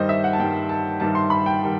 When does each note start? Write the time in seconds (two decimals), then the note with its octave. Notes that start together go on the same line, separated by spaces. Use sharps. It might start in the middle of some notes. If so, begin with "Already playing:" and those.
Already playing: G2 D#3 G3 C5 D#5
0.09 E5
0.24 F#5
0.33 A5
0.39 G2 D#3 G3 G5
0.69 A5
1.00 G2 D#3 G3 A5
1.15 C6
1.30 B5
1.46 G5
1.63 D#3 G3